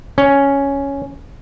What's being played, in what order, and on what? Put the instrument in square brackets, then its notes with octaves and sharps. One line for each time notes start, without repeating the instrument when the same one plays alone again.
[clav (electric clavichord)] C#4